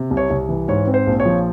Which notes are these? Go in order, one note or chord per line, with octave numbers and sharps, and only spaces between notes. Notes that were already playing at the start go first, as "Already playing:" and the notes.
Already playing: C3
C2
C#5
C2
E3
G#2 C#5
C4
C5
A#1
C#5
F3